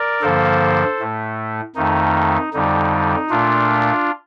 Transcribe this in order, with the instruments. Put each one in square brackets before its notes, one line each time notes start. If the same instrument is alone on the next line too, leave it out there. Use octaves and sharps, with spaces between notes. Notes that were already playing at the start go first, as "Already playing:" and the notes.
Already playing: [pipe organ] A#4 D5
G2 D3 F3 A#3 A4 C5
A2 A3
F2 D#3 A3 D#4
F2 D3 G3 D#4
A#2 A3 D4 F4